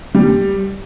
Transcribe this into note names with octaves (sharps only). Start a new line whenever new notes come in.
G3